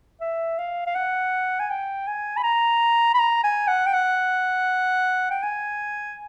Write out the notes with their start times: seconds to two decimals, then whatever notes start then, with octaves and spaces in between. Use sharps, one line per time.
0.21 E5
0.58 F5
0.86 F5
0.95 F#5
1.60 G#5
1.70 G5
2.07 G#5
2.37 B5
2.44 A#5
3.14 B5
3.19 A#5
3.44 G#5
3.68 F#5
3.87 G5
3.93 F#5
5.31 G5
5.43 G#5